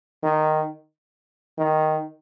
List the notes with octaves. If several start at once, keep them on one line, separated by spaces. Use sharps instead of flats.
D#3
D#3